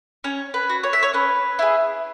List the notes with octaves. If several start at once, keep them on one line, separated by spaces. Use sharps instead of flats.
C#4 C#5
B4
F#4
C#5
E5
C#5
C#4 B4
E4 G#4